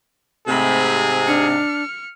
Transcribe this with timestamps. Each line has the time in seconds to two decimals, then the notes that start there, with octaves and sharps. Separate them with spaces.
0.48 G#2 C3 A3 G#4 B5
1.27 D4 F6 C#7